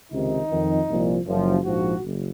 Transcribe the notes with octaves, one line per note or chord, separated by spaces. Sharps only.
C#2 C3 D#3 D#4
F2 D#3
C2 A#2 F3
F#1 F#2 F3
A#1 G#2 F3 F#4
F#1